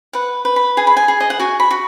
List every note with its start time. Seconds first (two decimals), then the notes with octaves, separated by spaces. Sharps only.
0.13 B4 F#5
0.45 B4
0.56 B5
0.77 G#4 G#5
0.87 B5
0.97 G#5
1.08 G#4
1.21 D#5
1.30 F#5
1.40 F#4 G#5
1.60 B5
1.71 F#4